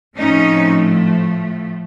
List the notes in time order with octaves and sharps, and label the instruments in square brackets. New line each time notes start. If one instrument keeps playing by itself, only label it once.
[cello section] A2 F3 A3 C4 C#4 D#4